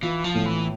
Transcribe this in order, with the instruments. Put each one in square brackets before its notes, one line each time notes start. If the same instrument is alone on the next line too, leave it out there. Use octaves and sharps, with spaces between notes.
[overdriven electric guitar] E3 [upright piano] F4
[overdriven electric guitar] F3
[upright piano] A2
[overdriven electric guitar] E3